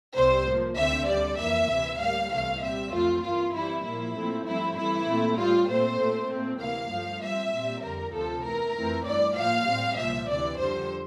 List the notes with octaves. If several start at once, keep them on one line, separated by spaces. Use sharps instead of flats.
C2 C3 G3 C4 C5
A2 F3 A#3
D2 D3 A3 C4 E5
D2 D3 G3 D5
F2 E3 A#3 E5
D2 C3 E3
A2 G3 A#3 F5
C2 C3 E3 A3 F5
A#2 G3 C4 E5
F2 E3 A3 C4 F4
G2 E3 A#3 F4
G2 E3 G3 C4 E4
A#2 F3 A#3 E4
A#2 F3 A3 C4
G2 F3 A3 C4 E4
G2 E3 A3 E4
A#2 A3 C4
A2 G3 C4 F4
A#2 A3 C4 C5
A#2 A3 C4
A#2 A3 C4
D2 C3 E3 A#3 F5
G2 F3 A3
G2 F3 C4 E5
A#2 G3 C4
F2 D3 G3 A#4
D2 C3 F3 C4 A4
E2 E3 A3 A#4
F2 E3 A3 C4
G2 E3 A3 D5
A2 F3 A#3 F5
A2 G3 C4
C2 A#2 F3 E5
D2 C3 E3 D5
F2 D3 G3 C5